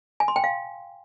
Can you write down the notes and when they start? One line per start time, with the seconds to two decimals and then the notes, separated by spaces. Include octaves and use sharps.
0.20 G#5
0.28 C6
0.36 G5
0.44 F5